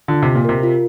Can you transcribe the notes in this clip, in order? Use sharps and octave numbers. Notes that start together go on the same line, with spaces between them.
D3 F4
C3 D#5
A#2
C3 A#4
F4